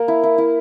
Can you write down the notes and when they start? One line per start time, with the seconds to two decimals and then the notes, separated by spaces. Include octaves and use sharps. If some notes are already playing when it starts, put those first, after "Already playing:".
Already playing: A#3 A#4
0.08 E4
0.23 E4
0.38 E4